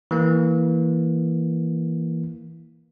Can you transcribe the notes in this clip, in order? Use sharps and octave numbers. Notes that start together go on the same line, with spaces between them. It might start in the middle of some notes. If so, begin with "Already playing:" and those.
E3 A#3